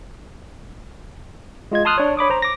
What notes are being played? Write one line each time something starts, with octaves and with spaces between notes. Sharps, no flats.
G#3 F4 D#5 G#6
A5 C6 D#6 F6 F#6
D4 C#5
C#5 B5 D6 D#6
C5 A#5
D6 A#6